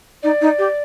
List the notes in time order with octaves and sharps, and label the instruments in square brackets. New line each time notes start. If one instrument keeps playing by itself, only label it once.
[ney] D#4 [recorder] D5
[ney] D#4
G4